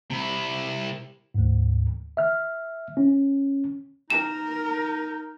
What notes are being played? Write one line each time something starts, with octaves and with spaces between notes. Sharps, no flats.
C3 E4
D2 G#2
E5 F6
C#4
D#4 A#4 E7